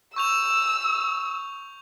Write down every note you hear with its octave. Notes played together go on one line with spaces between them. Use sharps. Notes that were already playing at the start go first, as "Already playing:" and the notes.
C#6 E6 G6 F7